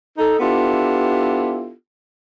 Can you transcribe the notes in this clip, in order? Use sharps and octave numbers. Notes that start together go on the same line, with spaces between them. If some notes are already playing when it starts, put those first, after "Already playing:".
D#4 A4
B3 D4 E4 F4 G4 A4